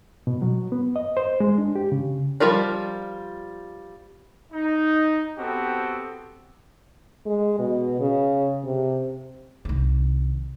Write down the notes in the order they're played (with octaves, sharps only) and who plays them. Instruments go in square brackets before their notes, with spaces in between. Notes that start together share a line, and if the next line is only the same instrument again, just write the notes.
[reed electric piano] B2
F#3
B3
D#5
C5
G#3
D4
G4
C#3
[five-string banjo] F3 G3 F4 A#4 D5
[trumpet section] D#4
B3 C4 F#4 G4 A4
[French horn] G#3
B2
C#3
C3
[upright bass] C2 D#3